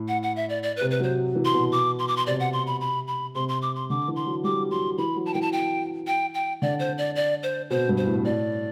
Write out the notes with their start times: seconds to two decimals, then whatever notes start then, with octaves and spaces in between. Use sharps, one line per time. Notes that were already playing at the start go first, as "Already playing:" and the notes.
Already playing: A2
0.08 F#5
0.23 F#5
0.36 E5
0.49 D5
0.63 D5
0.77 C3 B4
0.91 B4
1.00 F#3 C5
1.35 E3
1.45 C6
1.54 B2
1.72 D6
1.99 C6
2.08 D6
2.17 C6
2.27 C3 D5
2.40 F#5
2.53 C6
2.67 B5
2.81 B5
3.08 B5
3.35 C3 C6
3.49 C6
3.62 D6
3.76 C6
3.90 D3 D6
4.08 E3
4.16 C6
4.26 F#3
4.44 G3 D6
4.71 F#3 C6
4.98 E3 B5
5.16 F#3
5.26 A5
5.34 E3 G5
5.42 A5
5.53 G5
6.07 G5
6.34 G5
6.62 D3 D5
6.79 C5
6.98 D5
7.16 D5
7.43 C5
7.70 B2 C5
7.89 G2
7.97 C5
8.06 A2
8.24 A2 D5